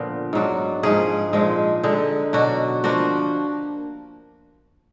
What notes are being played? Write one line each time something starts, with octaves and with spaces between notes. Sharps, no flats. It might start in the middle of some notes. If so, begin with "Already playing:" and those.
Already playing: A#2 D3 F3 B3 D4 A#4
G#2 F#3 D4
G#2 F3 A#3 G#4
A#2 F3 G#3
D3 G#3 D#4
B2 F#3 D4 F#4
F3 A#3 D4 F#4